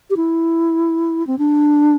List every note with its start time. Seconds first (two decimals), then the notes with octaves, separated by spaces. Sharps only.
0.10 G4
0.17 E4
1.27 C4
1.38 D4